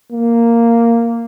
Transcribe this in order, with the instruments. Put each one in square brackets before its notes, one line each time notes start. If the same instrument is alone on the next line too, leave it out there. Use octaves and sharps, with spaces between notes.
[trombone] A#3